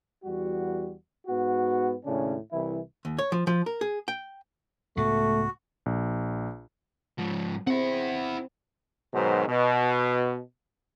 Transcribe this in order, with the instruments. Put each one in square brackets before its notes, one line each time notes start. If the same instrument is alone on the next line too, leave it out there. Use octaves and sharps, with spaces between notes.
[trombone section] E2 G3 F#4
G#2 B3 F#4
D#2 A2 C#3 C#4 D4
C2 E3 E4
[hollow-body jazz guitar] D#2
C#5
F3
F3
A#4
G#4
G5
[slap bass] C#2 A2 B3 [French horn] A3 [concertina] F#4
[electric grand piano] A#1
[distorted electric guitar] G#2 F3
[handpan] C4 [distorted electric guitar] E4 F#5
[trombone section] G#2 B2 D#3 F#3 C5
B2